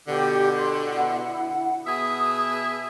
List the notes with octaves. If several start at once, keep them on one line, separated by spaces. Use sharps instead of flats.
B2 D3 G4
C6
E4 F#5
B2 G#4 E5 D#6